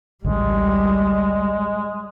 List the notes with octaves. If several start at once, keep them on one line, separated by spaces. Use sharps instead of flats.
A1 D2 D3 G3 G#3